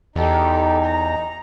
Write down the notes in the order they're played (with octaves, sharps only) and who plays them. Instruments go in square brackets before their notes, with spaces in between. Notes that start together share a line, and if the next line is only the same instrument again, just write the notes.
[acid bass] E2 [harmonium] D#4 [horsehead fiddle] G4 A4
[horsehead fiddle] A#5